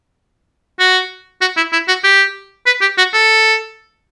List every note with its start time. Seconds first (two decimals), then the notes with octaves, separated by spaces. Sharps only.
0.80 F#4
1.41 F#4
1.57 E4
1.73 E4
1.88 F#4
2.04 G4
2.66 B4
2.81 G4
2.98 F#4
3.13 A4